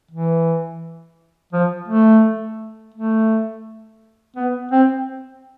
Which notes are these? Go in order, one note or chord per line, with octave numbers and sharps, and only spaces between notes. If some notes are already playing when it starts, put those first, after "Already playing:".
E3
F3
A3
A3
B3
C4